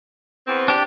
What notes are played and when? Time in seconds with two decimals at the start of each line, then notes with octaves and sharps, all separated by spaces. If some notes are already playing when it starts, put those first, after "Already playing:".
0.47 E2 B3 C4
0.68 D4 G4